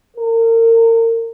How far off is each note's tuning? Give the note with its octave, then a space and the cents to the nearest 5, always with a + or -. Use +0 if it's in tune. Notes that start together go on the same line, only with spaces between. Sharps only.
A#4 -35